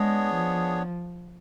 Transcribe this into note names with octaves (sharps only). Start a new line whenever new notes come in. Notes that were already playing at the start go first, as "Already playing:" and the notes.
Already playing: G#3 B3 D4 G#4 C#5
F3